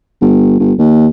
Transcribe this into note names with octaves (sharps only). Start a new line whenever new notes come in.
G1
G1
D#2